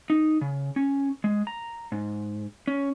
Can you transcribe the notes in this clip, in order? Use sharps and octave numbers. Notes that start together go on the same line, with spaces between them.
D#4
C#3
C#4
G#3
A#5
G#2
C#4